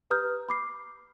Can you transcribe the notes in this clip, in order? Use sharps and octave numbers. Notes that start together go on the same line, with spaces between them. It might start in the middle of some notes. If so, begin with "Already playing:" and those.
G4 B4 A#5 D#6 F6 G6
B5 D6 C7